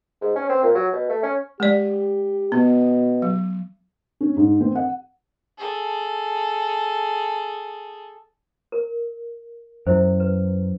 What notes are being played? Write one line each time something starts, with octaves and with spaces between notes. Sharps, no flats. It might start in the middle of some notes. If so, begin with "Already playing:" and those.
G#2
C#4
C4
A#2
F#3
B2
A3
C#4
G#3 G4 D5
B2 B3
F#3
C#4
G#2
C4
F#5
G#4 A4
A#4
F#2 E4 C5
B4